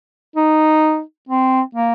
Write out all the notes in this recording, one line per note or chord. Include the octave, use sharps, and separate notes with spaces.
D#4
C4
A#3